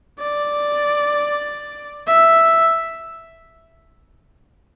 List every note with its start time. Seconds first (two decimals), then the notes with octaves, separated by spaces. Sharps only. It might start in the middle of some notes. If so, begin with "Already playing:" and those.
0.19 D5
2.07 E5